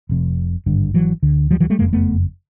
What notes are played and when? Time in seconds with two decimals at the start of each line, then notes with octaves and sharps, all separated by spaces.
0.09 F1 F2 C3
0.66 G#1 G2 D3
0.94 E3 F#3
1.22 D2 D3
1.51 F3 G3
1.60 E3 F#3
1.70 G3 A3
1.79 F#1 F2 C#3 G#3 A#3
1.93 A3 B3